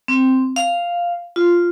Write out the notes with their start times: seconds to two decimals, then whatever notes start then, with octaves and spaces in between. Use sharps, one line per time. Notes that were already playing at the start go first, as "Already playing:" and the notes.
0.08 C4
0.56 F5
1.36 F4